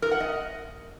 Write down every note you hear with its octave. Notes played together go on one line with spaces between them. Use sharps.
A#4
F#5
D#5